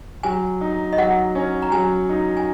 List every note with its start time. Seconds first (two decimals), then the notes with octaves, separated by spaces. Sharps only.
0.23 F#3 G#5
0.61 D#4
0.93 D#5
0.97 F#3 F#5
1.35 C#4
1.62 A#5
1.72 F#3 G#5
2.09 D#4
2.37 G#5